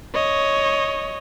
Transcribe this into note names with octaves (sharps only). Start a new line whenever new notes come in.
C#5 D#5